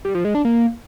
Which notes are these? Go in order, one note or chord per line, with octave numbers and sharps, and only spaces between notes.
G3
F3
G#3
D4
A#3